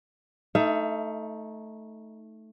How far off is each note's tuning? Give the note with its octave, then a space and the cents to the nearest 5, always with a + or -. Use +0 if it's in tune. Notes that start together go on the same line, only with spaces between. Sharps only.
A3 +0 D#4 +15 E5 +35